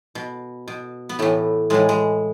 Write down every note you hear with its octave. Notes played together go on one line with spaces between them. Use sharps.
B2
B2
B3
A2 E3 A3
A2 E3 G#3
G#3